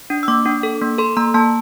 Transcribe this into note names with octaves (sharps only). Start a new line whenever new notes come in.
D4
E6
A#3 D6
D4
A4
A#3
A4 C6
A#3 A#5
A#3 A5